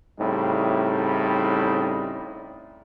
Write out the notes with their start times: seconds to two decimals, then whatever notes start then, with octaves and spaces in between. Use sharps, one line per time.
0.20 A2 C#3 G3 C4 D#4